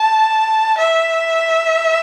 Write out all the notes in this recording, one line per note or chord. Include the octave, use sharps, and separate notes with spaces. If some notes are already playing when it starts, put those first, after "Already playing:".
Already playing: A5
E5